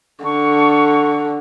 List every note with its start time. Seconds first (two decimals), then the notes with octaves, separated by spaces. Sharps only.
0.24 D3 C#6